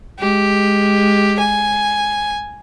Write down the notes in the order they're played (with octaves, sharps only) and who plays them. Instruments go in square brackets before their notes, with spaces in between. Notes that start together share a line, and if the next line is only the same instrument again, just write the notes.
[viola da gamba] G#3 [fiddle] G4
[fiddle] G#5